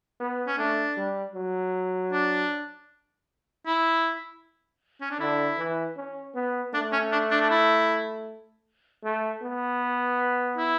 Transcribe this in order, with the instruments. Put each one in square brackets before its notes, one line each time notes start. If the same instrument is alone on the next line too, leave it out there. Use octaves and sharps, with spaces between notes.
[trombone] B3
[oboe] C#4
[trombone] A3 [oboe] D4
[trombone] G3
F#3
[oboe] D4
E4
C#4
D4
[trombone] D3 [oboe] E4
[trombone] E3
C#4
B3
[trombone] A3 [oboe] D4
[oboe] C#4
D4
D4
D4
E4
[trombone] A3
B3
[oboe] E4